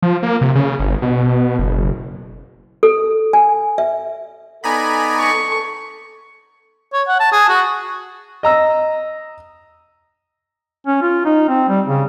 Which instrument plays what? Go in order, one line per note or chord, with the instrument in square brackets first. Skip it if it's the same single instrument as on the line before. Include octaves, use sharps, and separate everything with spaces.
[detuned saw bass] F3
A#3
C3
C#3
G1
B2
F#1
[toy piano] A4
G#5
E5
[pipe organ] B3 D#4 D5 [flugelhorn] A4 [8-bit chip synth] G#5 A#5 B5
[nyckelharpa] C#6
[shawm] C#5
F#5
A5
G#4
F#4
[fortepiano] D#5 A#5 E6
[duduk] C#4
F4
D#4
C4
G3
C#3